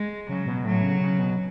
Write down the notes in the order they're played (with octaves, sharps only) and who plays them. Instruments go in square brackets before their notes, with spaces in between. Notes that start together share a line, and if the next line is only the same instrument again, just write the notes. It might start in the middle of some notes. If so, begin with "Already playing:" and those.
Already playing: [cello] G#3
[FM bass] C#3 [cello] F#3
[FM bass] B2
[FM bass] A2 [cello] F#3
[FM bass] C#3
C#3
B2